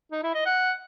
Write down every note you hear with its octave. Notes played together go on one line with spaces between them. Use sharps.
D#4
E4
D#5
F#5